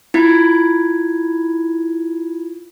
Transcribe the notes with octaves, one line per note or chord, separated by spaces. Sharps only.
E4 F4 G#6